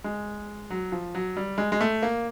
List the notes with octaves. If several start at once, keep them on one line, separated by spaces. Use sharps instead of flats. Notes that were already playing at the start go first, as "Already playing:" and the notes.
G#3
F#3
F3
F#3
G3
G#3
G#3
A3
A#3